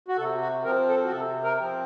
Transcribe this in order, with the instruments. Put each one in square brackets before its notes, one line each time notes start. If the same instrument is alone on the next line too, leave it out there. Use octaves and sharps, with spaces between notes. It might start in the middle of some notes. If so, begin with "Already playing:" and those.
[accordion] F#4
C3 A4
F#4
F3 C4 A#4
A4
F#4
C3 A4
A#4
F3 C4